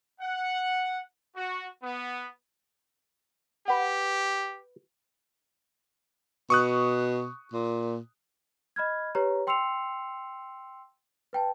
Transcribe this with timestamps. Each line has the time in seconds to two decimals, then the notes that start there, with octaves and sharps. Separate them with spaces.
0.20 F#5
1.36 F#4
1.83 B3
3.68 G4 B4 F#5
6.50 B2 C#6 D#6 F#6
7.53 A#2
8.76 D#5 B5 F6 G#6
9.15 G4 B4 C#5 A#5
9.47 G5 C6 E6 C7 C#7 F7
11.33 B4 G5 A5